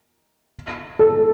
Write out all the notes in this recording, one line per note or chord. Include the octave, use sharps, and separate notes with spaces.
A4